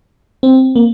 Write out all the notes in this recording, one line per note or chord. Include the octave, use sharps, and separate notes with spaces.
C4
A#3